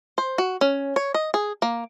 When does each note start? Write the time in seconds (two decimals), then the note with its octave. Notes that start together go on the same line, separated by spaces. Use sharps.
0.18 C5
0.38 F#4
0.61 C#4
0.96 C#5
1.14 D#5
1.34 G#4
1.62 A#3